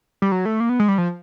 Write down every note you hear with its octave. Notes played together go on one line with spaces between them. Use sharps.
G3
F#3
A3
A#3
B3
G#3
G3
F3